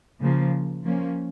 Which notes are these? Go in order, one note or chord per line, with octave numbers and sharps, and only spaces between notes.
C#3 F3 A#3
F3 A#3 C#4